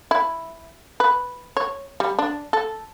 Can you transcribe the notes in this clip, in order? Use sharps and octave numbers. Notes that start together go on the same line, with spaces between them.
E4
B4
C#5
G3
D4
A4